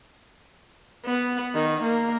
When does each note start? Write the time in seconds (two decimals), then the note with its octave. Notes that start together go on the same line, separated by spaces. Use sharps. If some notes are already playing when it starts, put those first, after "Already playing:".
1.06 B3
1.55 D#3
1.83 A#3